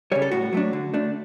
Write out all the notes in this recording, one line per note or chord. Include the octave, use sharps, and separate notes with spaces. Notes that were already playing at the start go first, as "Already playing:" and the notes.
C#3 G3 C#5
A4
A2 F#4
F#3 A3 D4
D3
A3 D4